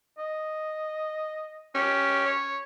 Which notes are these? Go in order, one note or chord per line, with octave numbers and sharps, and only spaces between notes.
D#5
C#4 G4
C#5